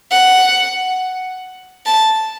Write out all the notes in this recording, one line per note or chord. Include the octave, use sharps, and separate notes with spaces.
F#5
A5